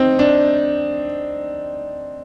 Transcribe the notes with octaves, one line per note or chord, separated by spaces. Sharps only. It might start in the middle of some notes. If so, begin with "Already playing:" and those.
Already playing: C4 D#4
D4